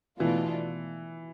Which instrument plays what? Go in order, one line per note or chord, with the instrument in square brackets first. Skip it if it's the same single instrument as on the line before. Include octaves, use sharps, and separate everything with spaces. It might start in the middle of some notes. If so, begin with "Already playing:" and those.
[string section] B2 A3 D4 F4 [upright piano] E3